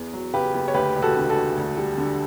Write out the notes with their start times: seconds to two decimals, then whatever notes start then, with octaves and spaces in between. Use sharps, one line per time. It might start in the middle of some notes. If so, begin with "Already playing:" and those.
Already playing: E2
0.13 F#3
0.34 C#3 G4 B4
0.54 F#1
0.68 C#5
0.74 D2 G4 B4
0.96 E1
1.02 F#4 A4
1.16 D3
1.29 F#4 A4
1.36 E1
1.57 D2
1.77 G3
1.97 D3